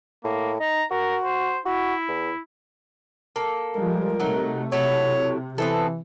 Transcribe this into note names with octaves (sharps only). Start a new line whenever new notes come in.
A2 A#3
D#4 A#5
F#4 A#4
C5
E4 F#4
E2
A#3 A4
F3 G3 G#3 A#4
C3 F#3 A3 D#4
C3 F#3 E4 A4 C#5
E3 B3 C4 A4